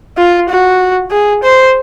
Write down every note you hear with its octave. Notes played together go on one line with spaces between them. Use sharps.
F4
F#4
G#4
C5